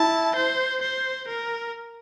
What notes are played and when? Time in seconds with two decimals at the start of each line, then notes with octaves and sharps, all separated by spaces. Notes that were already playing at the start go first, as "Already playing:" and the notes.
Already playing: E4 A5
0.35 C5
0.81 C5
1.28 A#4